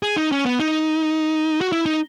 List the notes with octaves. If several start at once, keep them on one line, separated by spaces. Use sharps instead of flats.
G#4
D#4
C#4
B3
D#4
F#4
E4
D#4